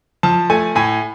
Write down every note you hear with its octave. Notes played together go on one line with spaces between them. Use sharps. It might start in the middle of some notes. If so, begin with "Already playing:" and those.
F3 A5
A3 G#5
A2 G#5